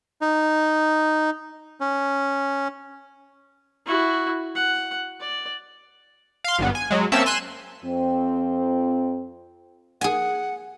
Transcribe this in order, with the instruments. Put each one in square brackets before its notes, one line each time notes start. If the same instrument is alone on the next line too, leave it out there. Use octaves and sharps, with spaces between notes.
[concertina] D#4
C#4
[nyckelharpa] E4 F#4
F#5
D5
[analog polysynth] F5 C6
G#1 G2 B3
G#5
F#3 G#3
A#3 C4 C#4 E5 A5 E6
G#5 C6 E6 F#6 D#7 E7
[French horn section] F2 C4
[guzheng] G#4 G#5 [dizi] F#5